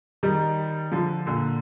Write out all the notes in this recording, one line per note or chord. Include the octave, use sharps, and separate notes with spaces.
D#3 G3
D3 F3
A#2 D3